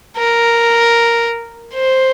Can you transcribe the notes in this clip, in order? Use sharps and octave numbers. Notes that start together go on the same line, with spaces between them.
A#4
C5